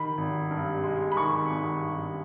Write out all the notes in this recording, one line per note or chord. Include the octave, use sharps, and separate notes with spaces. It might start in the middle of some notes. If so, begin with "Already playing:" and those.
Already playing: D#3 B5
G#1
G2
G#3
B5
D#3 C#6
G#1
G2